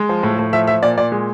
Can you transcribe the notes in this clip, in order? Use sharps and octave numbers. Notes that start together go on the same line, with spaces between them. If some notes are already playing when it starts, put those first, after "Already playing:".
Already playing: G#3
F3
A2
A2
F3 E5
F3 E5
A#2 D5
A#2 D5
G#3